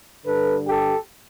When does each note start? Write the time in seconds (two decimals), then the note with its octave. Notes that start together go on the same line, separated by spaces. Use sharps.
0.25 G2 D3 A4 B4
0.66 G4 A4